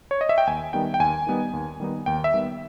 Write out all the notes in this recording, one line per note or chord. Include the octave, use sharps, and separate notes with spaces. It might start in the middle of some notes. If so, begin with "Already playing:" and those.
C#5
D#5
E5
G5
D#2 G#5
D#3 G3 B3 D#4 G5
G5
D#2 G#5
D#3 G3 B3 D#4
D#2
D#3 G3 B3 D#4
D#2 G5
E5
D#3 G3 B3 D#4